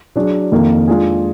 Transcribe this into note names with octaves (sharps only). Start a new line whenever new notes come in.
F#3 D4 G#4
F2 D#3 A#3
G#3 D4 F4 G#4